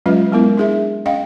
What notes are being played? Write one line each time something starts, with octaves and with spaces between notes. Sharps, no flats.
F#3 G#3 C#4 F4 B4 D#5
F#3 G#3 B3 E4 A#4
D4 G#4 E5
C#4 D#5 F5 G5